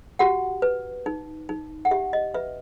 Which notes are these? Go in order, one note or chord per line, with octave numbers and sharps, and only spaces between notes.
F#4 G4 F#5
B4
D#4
D#4
F#5
G4 E5
D#5
B4 E5